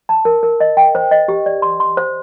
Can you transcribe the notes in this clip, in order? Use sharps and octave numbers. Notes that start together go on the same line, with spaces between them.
A5
A#4
A#4
D#5
G5
C5
D#5
G4
D5
C6
C6
C5